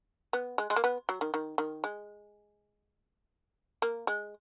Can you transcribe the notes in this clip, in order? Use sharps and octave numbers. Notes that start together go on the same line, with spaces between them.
B3
G#3
G#3
A#3
B3
F#3
D#3
D#3
D#3
G#3
A#3
G#3